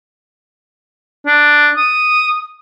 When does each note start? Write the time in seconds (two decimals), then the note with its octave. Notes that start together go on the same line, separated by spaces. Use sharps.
1.26 D4
1.77 D#6